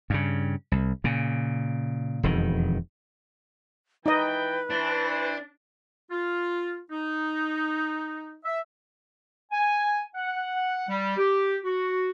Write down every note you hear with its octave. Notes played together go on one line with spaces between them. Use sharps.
G2 C#3
C2
A#2 C#3
E1 F2 D#3
E3 D#4 B4 D#5 G5
E3 D4 C5
F4
D#4
E5
G#5
F#5
G3
G4
F#4